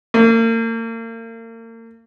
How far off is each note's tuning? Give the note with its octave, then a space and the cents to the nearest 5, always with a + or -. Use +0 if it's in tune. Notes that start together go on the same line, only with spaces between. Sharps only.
A#3 -40